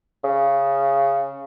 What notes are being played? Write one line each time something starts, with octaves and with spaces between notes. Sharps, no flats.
C#3